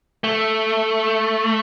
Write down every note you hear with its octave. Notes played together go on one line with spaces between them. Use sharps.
A3